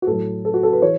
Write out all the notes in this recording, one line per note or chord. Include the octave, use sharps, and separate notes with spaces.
F#4
A2 F#3 A4
A4
F#4
A4
B4
E3 C#5